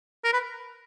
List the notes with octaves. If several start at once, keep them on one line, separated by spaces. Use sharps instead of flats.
A#4
B4